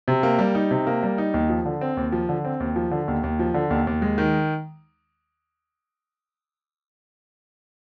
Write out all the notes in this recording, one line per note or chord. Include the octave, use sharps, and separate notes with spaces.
C3
A#3
G3
D#4
C3
A#3
G3
D#4
D#2
F3
D3
C4
D#2
F3
D3
C4
D#2
F3
D3
D#2
D#2
F3
D3
D#2
D#2
G#3
D#3